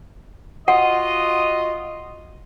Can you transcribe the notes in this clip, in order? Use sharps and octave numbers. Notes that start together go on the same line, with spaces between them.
F4 F#4 D#5 F#5